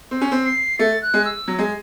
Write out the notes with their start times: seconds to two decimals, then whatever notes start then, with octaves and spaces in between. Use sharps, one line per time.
0.11 C4
0.21 C#4
0.32 C4
0.45 C7
0.79 A3 A6
1.02 F#6
1.14 G#3
1.25 E6
1.48 F#3
1.59 G#3